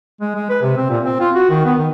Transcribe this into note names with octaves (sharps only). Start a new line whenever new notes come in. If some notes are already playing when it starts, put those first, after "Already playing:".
G#3
G#3
B4
C3
C4
A#2
C4
F4
F#4
D#3
B3
D#3